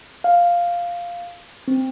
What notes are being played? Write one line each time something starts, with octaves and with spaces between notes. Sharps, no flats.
F5
C4